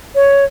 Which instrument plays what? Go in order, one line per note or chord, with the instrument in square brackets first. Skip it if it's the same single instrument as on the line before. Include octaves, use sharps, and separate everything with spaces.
[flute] C#5